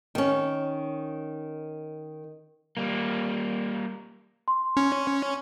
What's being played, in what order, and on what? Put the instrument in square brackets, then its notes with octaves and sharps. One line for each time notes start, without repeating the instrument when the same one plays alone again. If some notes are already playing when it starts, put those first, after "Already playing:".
[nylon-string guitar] D#3 C#4
[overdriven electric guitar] G3 A#3
[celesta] C6
[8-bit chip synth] C#4